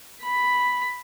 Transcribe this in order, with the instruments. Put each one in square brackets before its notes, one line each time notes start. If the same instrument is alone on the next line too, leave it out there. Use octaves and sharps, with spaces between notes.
[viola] B5